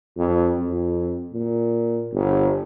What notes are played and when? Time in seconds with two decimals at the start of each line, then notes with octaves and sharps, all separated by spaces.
0.18 F2
0.59 F2
1.33 A#2
2.13 G1